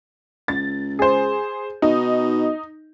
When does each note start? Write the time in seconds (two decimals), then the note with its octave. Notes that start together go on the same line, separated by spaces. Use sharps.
0.48 C#2 A6
0.99 G#4 C5
1.82 B2 D#4